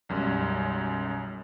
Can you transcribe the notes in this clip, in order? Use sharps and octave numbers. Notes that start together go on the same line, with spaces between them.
B1 F#2 G3 G#3